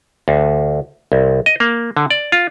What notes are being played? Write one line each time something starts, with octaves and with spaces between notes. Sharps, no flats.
D2
C2
D#5
A#3
D3
D5
F4